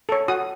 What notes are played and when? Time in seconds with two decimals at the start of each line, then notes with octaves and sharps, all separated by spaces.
0.09 A4 C#5
0.28 F#4 D#6